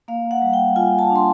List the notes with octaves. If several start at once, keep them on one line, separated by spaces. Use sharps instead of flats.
A#3 F5
F#5
G3
G5
F4 G#5
A5
D4
C6